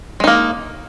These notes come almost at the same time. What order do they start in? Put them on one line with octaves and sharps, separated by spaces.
G#3 D#4 A#3